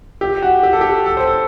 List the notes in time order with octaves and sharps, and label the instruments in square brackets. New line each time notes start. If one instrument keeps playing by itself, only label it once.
[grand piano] G4
F#4
G4
A4
G4
A4
C5
A4